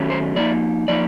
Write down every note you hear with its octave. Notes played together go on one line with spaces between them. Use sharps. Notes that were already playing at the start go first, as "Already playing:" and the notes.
Already playing: D#3 F#3 A3 C#4
C5
F3 A#3 D#4 D5
F3 A#3 D#4 D5